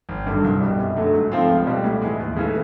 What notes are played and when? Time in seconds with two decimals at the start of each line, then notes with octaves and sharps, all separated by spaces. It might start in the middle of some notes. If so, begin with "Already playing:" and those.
0.09 G#1
0.27 G2 D3 F#3
0.44 C2
0.61 B2 G3
0.79 F#2
0.97 D3 F#3 A3
1.14 G#2
1.32 F3 A3 C4 F4
1.49 C#2
1.67 B2 G3
1.84 A2
2.02 E3 G#3
2.19 D#2
2.36 C#3 E3 A3